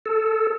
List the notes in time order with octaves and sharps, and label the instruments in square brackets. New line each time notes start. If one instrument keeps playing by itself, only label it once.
[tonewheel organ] A4